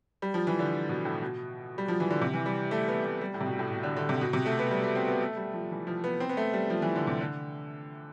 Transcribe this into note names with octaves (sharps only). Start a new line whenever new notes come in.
G3
F3
E3
D3
B2
A2
B2
G3
F3
E3
D3
C3
E3
G3
A3
B3
A3
G3
A2
C3
B2
A2
B2
D3
D3
C3
B2
C3
A3
B3
G3
A3
C4
B3
A3
G3
F3
E3
F3
B3
C4
B3
A3
G3
F3
E3
D3
C3
D3